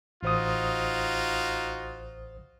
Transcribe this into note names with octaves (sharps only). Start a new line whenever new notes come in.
A1 D#4 F4 F#4 C5 D#6